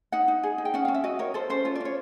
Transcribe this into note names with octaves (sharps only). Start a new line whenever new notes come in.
D#4 F#5
D#4
G#4
D#4
G5
C#4 F#5
C#4 F5
E5
F#4 D#5
A#4 C#5
A4 C5
C#4 C5
F4 C#5
D5
C#4 C#5